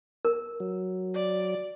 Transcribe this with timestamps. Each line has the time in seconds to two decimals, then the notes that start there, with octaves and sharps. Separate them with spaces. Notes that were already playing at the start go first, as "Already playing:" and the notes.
0.25 A#4
0.60 F#3
1.15 D5